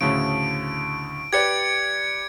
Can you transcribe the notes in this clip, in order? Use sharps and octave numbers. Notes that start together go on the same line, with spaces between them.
D2 A2 C#3 D7
G4 B4 D5 G#6 C#7